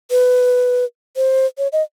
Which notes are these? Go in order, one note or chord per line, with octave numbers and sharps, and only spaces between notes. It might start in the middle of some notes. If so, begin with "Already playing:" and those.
B4
C5
C#5
D#5